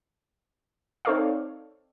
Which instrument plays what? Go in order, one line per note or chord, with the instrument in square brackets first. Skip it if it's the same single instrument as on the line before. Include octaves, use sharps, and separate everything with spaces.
[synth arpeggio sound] C4 D#4 A4 C#5 D5 F5